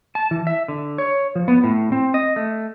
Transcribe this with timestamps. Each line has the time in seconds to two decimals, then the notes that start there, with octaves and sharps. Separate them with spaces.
0.15 A5
0.31 E3
0.47 E5
0.68 D3
0.98 C#5
1.36 F3
1.48 B3
1.64 A2
1.92 C4
2.14 D#5
2.36 A3